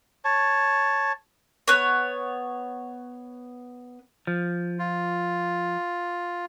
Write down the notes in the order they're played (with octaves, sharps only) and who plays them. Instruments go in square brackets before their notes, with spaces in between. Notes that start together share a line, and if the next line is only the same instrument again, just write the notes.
[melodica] C#5 A5
[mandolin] B3 C#5
[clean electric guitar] F3
[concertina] F4